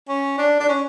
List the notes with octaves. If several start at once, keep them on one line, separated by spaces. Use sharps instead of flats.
C#4
D4
D4
C#4